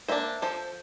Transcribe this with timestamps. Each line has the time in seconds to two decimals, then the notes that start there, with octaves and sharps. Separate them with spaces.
0.08 A#3 D4 C5 E5
0.42 F3 A4 C5